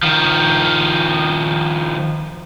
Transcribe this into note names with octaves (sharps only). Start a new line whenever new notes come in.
D#3 F3